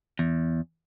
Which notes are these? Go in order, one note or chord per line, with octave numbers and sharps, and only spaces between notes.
E2